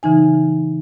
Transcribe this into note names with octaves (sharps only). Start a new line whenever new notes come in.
C#3 E3 D#4 G#5